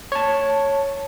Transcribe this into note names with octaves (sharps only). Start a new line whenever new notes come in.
C#5 A5